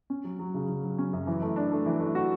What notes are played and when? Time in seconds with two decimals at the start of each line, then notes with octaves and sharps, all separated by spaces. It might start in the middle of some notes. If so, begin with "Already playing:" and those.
0.10 C#4
0.24 F#3
0.39 F#3
0.54 C#3
0.68 F#3
0.83 F#3
0.98 C#4
1.13 F#2
1.27 E3
1.42 A3
1.56 D4
1.72 A3
1.86 E3
2.00 A3
2.15 F#4